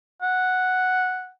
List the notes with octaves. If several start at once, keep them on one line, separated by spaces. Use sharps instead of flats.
F#5